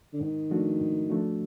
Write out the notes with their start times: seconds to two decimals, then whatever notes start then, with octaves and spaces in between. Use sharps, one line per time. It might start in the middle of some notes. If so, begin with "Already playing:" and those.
0.13 D3
0.21 G#2 D#3
0.51 F3 A3 D4 F#4
0.81 G#2
1.10 F3 A3 D4 F#4